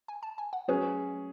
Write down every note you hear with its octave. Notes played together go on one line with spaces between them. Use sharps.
G#5
A5
G#5
F#5
F#3 C#4 G#4 B4